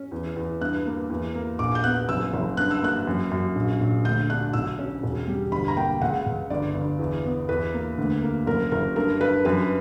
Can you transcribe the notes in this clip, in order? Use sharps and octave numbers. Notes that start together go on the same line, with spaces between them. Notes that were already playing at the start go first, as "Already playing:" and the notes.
Already playing: C#4
E2
E2
G2 F#6
A#3
E2
A#3
A#1 D6
G6
B3 F#6
F#1 E6
F#1
G2 F#6
E6
A#3 F#6
F#2
F#2
A#1
A#1
D2 G6
D4 F#6
B1 E6
C#4
E1
G3
G1 B5
A#5
A#3 G5
C#2 F#5
C#2
G1 D5
G1
E2
B3
E2 B4
A#3
D2
A#3
F#1 A#4
F#1 A#4
G2 A#4
G2 B4
F#2 B4